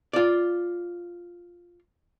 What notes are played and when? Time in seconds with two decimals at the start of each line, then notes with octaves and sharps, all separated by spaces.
0.13 F4 D5